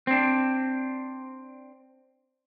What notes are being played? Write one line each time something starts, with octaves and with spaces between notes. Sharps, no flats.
C4 D4